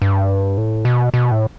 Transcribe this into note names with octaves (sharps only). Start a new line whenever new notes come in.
G2
A2
B2
B2
A2